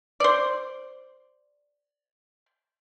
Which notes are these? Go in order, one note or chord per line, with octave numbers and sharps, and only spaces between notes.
C5 D5